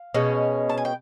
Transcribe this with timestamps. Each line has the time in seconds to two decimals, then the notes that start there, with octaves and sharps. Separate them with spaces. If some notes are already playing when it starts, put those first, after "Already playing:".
Already playing: F5
0.14 B2 G#3 C#4
0.70 A5
0.78 G#5
0.85 G5